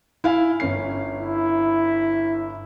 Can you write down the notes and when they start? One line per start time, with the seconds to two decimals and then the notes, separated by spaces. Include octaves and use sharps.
0.24 E4 F5 G#5
0.60 G1 C#4 C7
1.18 E4